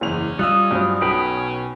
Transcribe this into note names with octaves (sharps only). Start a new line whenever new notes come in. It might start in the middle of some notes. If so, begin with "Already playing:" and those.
F#1 E2 C#4 F7
G3 F4 D#5 D#6 E6 F#6
G2 F#3 C5
B1 B2 C#4 B4 G5 B5